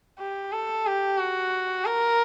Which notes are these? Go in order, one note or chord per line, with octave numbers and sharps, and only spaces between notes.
G4
A4
G4
F#4
A#4